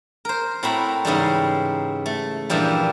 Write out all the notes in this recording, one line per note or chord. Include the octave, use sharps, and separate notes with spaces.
A#4 C5
A2 C4 F#4 E5 A#5 B5
G#2 C#3 E3 G3
A3
G2 A#2 E3 F3 G3